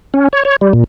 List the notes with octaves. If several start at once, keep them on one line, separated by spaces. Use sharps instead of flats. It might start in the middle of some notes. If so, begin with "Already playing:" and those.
C#4
C#5
C#5
G3
A#2